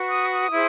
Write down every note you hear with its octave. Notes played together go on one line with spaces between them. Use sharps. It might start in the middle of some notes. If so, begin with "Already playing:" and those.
Already playing: F#4 B4
D#6
D#6
E4 G#4 C5